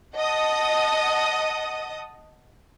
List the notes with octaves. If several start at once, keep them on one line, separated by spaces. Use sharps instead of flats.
D#5 F#5 A5 D#6